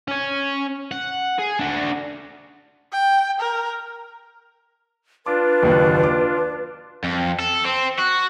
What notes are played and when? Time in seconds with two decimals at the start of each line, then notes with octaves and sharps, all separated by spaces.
0.08 C#4 C#5
0.91 F#5
1.38 G#4
1.59 D4 F#4
2.92 G5
3.40 A#4
5.26 D4 F4 B4 D6
5.62 F#1 D#2
6.03 D6
7.04 F2
7.40 A4
7.65 C4
7.99 F#4